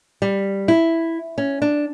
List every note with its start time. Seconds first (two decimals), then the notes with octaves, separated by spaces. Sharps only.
0.22 G3
0.68 E4
1.38 C#4
1.62 D4